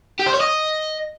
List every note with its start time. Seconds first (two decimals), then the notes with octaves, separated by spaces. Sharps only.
0.19 G4
0.26 C5
0.33 C#5
0.40 D#5